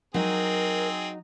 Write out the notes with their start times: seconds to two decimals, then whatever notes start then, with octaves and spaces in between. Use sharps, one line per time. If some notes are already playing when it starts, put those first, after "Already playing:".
0.14 F#3 C4 D#4 G#4 A#4